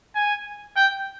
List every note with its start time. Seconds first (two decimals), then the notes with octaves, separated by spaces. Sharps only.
0.15 G#5
0.77 G5